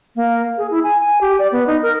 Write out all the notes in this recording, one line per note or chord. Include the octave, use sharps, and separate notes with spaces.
A#3
G#4
E4
G#5
G#5
G4
D5
B3
D#4
A#4